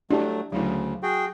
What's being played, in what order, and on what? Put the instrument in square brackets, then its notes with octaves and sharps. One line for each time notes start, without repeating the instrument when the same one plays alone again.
[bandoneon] F#3 A3 [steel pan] D4 G4 [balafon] E4
[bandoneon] D2 C#3 [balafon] F#3 E4
[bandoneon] F#4 G#4 G5